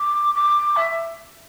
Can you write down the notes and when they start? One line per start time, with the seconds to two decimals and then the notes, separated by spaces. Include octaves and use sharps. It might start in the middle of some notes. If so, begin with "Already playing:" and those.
Already playing: D6
0.34 D6
0.76 E5